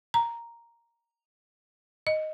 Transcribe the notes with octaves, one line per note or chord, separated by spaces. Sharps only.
A#5
D#5